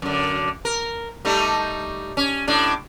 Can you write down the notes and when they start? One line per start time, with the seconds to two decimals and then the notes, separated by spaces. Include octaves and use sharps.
0.02 F#2 D3
0.65 A#4
1.25 G3 A3 D#4
2.17 C#4
2.48 A2 D4